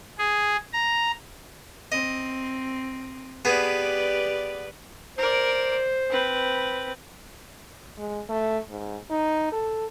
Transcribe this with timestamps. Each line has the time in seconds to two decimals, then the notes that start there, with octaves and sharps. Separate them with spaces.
0.18 G#4
0.73 A#5
1.92 C4 D#5
3.45 B3 G4 G#4 B4 D5
5.18 A#4 C5 D5
6.10 C4 B4
7.98 G#3
8.29 A3
8.69 G#2
9.10 D#4
9.52 A4